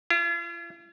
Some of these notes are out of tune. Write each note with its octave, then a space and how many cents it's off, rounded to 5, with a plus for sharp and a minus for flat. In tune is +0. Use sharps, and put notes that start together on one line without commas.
F4 -45